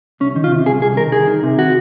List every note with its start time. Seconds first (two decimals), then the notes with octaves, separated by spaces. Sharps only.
0.20 C2 C#4
0.36 D#3
0.44 F4
0.51 C3
0.66 C2 G#4
0.82 C2 G#4
0.97 D#3 A#4
1.12 C2 G#4
1.27 D#3
1.43 C3
1.59 F#4